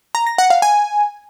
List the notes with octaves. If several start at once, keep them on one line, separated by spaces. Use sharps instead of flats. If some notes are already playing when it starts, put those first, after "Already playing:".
A#5
A#6
F#5
F5
G#5